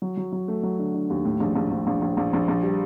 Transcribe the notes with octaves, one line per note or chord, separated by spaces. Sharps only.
F#3
F#3
F#3
A3
F#3
D3
D3
D#2
A2
A#1
A#1
A#1
A#1
A#1
A#1
A#1
A#1
G3